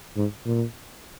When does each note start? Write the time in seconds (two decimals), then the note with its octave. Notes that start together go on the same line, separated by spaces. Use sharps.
0.17 G#2
0.46 A#2